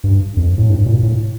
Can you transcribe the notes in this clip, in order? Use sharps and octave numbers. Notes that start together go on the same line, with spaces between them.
G2
F2
A2
G2
A#2
A2